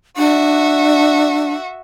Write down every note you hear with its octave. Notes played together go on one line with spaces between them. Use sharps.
D4 F#4 E5